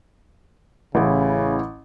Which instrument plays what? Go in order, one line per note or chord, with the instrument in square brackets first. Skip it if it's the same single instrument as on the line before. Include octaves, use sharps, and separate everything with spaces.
[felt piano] A1 E4 [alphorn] C#3